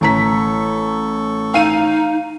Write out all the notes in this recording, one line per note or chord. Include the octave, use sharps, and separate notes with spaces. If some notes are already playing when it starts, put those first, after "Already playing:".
A1 A4 A#5 C#6 B6
D#4 F5 D#7